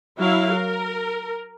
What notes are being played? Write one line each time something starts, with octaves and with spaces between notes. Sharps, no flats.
F#3 E4 F5
A#4